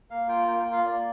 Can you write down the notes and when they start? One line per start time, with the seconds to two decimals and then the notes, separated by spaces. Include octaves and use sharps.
0.10 A#3 F5
0.28 F4 G5
0.48 A#3 G5
0.60 G5
0.66 F4
0.72 F5
0.84 A#3 D5